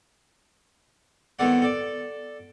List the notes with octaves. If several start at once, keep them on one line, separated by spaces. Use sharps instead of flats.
C2 D#3 B3 A4 D5 F#5
A4 D5